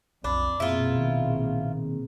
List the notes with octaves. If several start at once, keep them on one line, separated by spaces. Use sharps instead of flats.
B1 F2 D4 B5
A#1 F#2 B2 A#3 C4 E4 F4 G#4
D#3